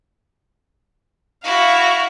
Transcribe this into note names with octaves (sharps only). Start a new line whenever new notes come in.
E4 F#4 F5 C#6